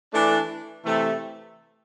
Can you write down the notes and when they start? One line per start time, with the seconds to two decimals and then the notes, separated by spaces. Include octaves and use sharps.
0.14 E3 A3 D4
0.85 C3 E3 A3